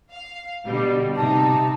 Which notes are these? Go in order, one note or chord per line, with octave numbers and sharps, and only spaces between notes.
F5
B2 D3 G3
C3 D#4 A5